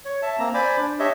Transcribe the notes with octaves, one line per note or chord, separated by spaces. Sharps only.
C#5
E5 A5
A#3 C4 A#5
C5 D5 G#5 B5 D6
D4
G4 C#5 D#5 E5